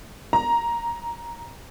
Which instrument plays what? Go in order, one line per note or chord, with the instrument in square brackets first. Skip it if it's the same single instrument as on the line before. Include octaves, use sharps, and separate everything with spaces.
[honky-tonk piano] A#5